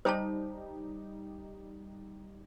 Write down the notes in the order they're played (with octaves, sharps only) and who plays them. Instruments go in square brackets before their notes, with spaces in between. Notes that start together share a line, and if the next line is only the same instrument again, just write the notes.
[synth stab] G3 D#4 G4 [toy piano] C5 A5